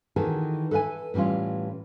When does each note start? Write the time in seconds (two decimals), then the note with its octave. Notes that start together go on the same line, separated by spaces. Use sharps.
0.16 D#3 E3 F#4 G#4 A4
0.71 A4 B4 E5 F5 G#5
1.14 A2 E3 G3 C#4 F4